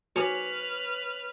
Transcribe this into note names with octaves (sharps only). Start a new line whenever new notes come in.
F#4 B4 C#5 G#5 D6 F6